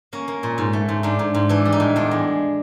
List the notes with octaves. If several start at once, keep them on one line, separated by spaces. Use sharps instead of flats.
A#3 C#4
A#3
A#2
G#2
A3
G#2
G#2 D4
G#2
G#2
E3 D4
G3
D#4
A2
E2 D4
G#3